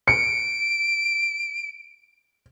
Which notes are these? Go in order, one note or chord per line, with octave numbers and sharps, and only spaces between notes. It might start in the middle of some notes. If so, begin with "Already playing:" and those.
C#7 D7